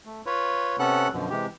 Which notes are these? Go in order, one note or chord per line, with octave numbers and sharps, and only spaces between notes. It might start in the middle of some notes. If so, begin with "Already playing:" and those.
A3
F4 B4 C#5
C3 B3 C#4 A4 F#5 F#6
F#2 B2 D3 F3
C3 E3 G#3 G4